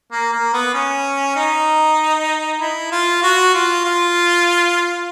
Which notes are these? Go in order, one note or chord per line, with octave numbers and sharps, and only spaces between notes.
A#3
A#3
B3
C#4
D#4
E4
F4
F#4
F4
F4